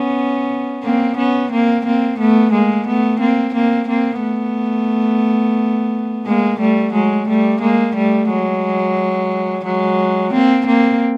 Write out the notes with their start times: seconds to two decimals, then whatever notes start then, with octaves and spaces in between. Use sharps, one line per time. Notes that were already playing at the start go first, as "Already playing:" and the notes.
Already playing: B3 C#4
0.83 A#3 C4
1.17 B3 C#4
1.51 A#3 C4
1.86 A#3 C4
2.19 A3 B3
2.53 G#3 A#3
2.87 A3 B3
3.20 A#3 C4
3.54 A#3 C4
3.88 A#3 C4
4.22 A3 B3
6.26 G#3 A#3
6.60 G3 A3
6.94 F#3 G#3
7.28 G3 A3
7.61 G#3 A#3
7.95 G3 A3
8.30 F#3 G#3
9.65 F#3 G#3
10.33 A#3 C4
10.67 A#3 C4